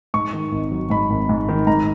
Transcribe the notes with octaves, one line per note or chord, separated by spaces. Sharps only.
G#2 C#6
D#3
G#1
F#3
G#2 B5
G#1
G#2
D#3
G#2 A#5